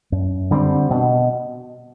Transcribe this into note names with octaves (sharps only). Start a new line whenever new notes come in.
F#2
D3 G3 C4
B2